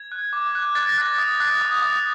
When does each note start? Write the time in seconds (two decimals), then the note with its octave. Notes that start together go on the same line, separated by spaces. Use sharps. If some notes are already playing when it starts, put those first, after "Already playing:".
Already playing: G#6
0.12 F#6
0.33 D6
0.55 F#6
0.75 F#6 A6
0.89 A#6
0.98 F#6 A6
1.18 D#6
1.40 F#6
1.61 D#6
1.82 D#6